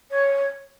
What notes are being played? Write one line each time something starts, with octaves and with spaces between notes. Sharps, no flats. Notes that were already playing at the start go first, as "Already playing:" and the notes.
C#5